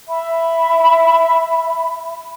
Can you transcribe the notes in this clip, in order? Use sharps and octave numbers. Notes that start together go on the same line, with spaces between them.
E5 B5